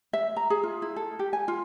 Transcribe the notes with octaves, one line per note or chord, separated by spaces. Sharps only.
E5
A#5
G#4
F4
E4
A4
G4
G#5
F4